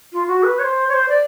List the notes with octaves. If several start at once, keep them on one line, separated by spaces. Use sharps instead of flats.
F4
F#4
B4
C#5
C5
C#5
C5
D5